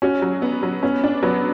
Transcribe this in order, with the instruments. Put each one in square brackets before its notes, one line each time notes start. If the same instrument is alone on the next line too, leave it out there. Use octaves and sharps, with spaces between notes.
[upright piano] C#4 [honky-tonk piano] F#4
[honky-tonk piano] F#3
B3
F#3
[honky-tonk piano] B3 [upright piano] C#4
[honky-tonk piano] D4
[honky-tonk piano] F#3 [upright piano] B3